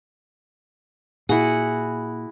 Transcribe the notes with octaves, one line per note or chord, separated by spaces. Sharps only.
A#2 E4 F#4 G#4 F#5